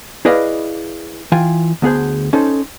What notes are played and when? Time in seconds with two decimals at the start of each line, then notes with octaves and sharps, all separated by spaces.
0.25 E4 G#4 B4 D5 D#5 F5
1.32 E3 F4 G5 G#5
1.82 D2 B3 G#4 C5
2.33 C#4 D#4 A4 C5